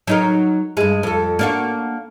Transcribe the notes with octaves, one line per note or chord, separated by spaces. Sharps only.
F#3 D#4 A#4
G2 G#3
F2 A4
A#3 D4 F#4